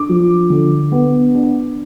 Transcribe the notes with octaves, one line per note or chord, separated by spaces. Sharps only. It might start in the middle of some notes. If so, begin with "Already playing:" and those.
Already playing: D4 D6
F3
D3
B3
D4